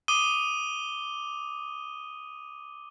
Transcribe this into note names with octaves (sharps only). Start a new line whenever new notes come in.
D6 D#6 D#7 G7